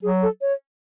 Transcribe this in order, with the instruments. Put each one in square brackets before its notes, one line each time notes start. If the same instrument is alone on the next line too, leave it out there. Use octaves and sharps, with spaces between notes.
[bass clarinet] F#3 [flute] G#4
[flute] A4
C#5